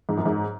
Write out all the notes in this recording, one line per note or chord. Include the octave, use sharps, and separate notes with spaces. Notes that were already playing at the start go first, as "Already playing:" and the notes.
G#2
F#2
G#2